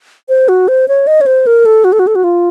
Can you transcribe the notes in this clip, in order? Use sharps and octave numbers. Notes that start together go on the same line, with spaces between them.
C5
F#4
C5
C#5
D#5
C#5
C5
A#4
A4
F#4
A4
F#4
A4
F#4
F4